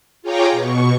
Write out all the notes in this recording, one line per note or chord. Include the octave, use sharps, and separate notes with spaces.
F4 G#4 C#5 G5 A#5 D6
B2 C#6